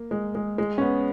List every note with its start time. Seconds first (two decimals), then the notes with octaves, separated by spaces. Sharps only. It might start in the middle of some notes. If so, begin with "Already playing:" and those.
Already playing: A#3
0.11 G#3
0.35 G#3
0.58 G#3
0.78 C#4
0.81 B3